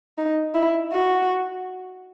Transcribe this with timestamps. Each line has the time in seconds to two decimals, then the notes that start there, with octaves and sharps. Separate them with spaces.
0.18 D#4
0.55 E4
0.93 F#4